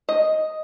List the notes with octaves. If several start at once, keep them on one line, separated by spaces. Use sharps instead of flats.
D#5